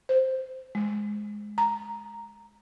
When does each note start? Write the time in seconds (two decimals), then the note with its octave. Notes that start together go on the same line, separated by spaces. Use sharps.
0.09 C5
0.75 G#3
1.58 A#5